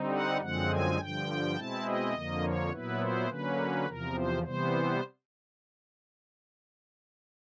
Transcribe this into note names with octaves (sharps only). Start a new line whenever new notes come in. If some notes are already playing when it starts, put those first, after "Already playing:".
Already playing: D3 G3 C4 D#4
F#5
F#2 D3 F3 G#3 C4 F#5
G#5
G2 D3 F3 G5
B2 G#3 C4 E4 A5
D#5
F2 D3 F3 A#3
C#5
A#2 F#3 B3 E4 B4
C5
D3 F#3 A#3 C#4 B4
E2 C3 F3 A#4
C5
C3 E3 G3 B3 C5